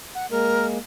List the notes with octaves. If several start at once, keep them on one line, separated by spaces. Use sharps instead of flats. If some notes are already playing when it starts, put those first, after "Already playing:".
F#5
G#3 A#3 A#4